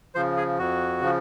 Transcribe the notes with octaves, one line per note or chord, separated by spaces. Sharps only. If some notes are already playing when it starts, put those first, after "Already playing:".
C#3 F3 C5
G#4
F2 F#4
C#3 F3